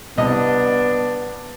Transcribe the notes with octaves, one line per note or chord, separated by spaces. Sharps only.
C2 B3 D4 D#5